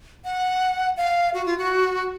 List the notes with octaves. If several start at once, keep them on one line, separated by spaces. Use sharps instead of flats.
F#5
F5
F#4
F4
F#4